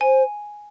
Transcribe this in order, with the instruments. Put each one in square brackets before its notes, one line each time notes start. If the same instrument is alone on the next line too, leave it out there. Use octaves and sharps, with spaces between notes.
[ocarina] C5 [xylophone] G#5